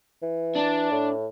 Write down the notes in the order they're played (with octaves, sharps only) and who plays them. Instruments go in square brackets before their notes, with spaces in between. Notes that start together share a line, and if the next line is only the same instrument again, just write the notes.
[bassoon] E3
[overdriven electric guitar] D4
[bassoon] A2